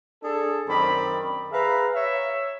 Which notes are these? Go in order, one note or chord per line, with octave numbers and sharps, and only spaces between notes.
D4 G#4 A4
F#2 D#3 C4 D5 B5
G#4 B4 E5 F5 A#5
C#5 E5